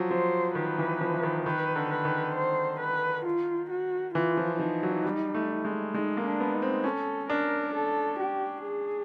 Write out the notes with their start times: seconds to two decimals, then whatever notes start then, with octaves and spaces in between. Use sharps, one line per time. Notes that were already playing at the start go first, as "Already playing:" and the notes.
Already playing: F3 F#3
0.11 F3 C5
0.55 D#3 B4
0.78 E3
1.01 F3
1.14 E3
1.23 D#3
1.46 D#3 B4
1.76 D3
1.90 B4
2.05 D#3
2.35 C5
2.80 B4
3.26 F4
3.70 F#4
4.15 E3 F4
4.37 F3
4.59 F3 D#4
4.83 F#3
5.05 G3
5.34 A3
5.65 G#3
5.94 G#3 D#4
6.17 A#3
6.25 D4
6.40 B3
6.54 D#4
6.62 C4
6.84 C#4 A4
7.30 D4 A#4
7.75 A4
8.20 G4
8.64 G#4